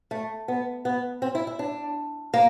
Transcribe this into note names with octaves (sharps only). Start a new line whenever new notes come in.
A3
B3
B3
C4
E4
E4
D4
A#3